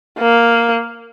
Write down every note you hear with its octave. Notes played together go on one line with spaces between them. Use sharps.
A#3